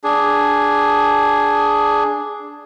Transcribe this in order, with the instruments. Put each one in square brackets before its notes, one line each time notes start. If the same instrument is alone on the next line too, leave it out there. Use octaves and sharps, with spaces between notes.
[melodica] D4 G#4